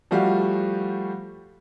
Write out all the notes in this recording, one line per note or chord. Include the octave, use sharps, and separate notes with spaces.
F3 G3 A3 F#4 G4 F5